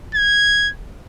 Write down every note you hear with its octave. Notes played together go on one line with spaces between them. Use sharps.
G#6